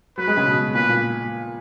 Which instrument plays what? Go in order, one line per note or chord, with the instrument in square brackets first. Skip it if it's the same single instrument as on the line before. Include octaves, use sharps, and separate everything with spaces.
[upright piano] F#3 [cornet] B4
[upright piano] G#3
C#3
B2
[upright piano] A#2 [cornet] B4
[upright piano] A#2